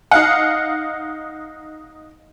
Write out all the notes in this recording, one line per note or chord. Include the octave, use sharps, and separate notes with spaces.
D#4 F5 F#5